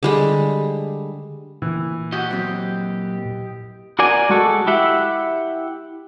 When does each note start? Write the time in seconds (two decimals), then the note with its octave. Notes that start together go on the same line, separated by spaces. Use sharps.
0.03 D3 G3 G#3
1.62 A#2 E3
2.13 F#4 G4 D#5
2.31 F#3 C4
3.99 F#4 A#4 D5 G#5
4.30 G#3 F#4 A4
4.67 E4 G4 E5 F#5